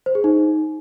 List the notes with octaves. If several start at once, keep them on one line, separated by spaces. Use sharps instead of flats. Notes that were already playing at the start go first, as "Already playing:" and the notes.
C5
G#4
D#4